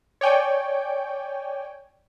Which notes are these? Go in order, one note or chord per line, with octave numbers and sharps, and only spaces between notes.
C#5 D5 G5 G#5